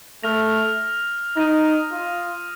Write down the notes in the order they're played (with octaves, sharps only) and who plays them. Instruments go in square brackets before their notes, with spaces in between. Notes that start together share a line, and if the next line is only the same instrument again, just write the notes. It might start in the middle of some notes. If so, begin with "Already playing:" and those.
[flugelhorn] A3 [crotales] F6 A#6 F7
[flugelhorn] D#4 [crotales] D#6 A#6 D#7
[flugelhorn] F4